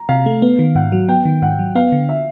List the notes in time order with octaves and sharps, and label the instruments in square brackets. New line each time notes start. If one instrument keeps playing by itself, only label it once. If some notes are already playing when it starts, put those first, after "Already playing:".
Already playing: [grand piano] A#5
[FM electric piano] C3 [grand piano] F5
[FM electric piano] A3
B3
D#3
[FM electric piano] G#2 [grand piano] F#5
[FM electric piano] F#3
[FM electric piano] B3 [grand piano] G5
[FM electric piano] D#3
[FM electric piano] G#2 [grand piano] F#5
[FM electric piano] F#3
[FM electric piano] B3 [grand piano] F5
[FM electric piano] D3
[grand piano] E5